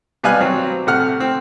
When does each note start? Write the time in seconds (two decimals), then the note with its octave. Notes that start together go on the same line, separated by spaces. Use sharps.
0.23 B2 G3 B4 F5 G#5 F#6
0.40 F#3 C4
0.87 A2 C3 F#5 F6
1.20 C4